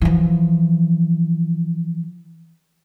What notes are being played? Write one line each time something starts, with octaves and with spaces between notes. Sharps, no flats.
E3 F3